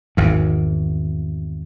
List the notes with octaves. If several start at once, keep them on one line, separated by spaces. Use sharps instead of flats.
G#1 E2